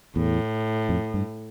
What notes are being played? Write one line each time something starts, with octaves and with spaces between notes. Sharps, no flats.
E2 A2
F2
G2